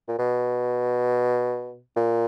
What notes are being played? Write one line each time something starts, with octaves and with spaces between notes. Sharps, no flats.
A#2
B2
A#2